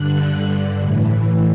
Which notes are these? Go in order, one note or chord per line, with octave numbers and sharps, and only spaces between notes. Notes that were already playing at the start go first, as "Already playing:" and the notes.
Already playing: G2 D3 F#6
A2 E3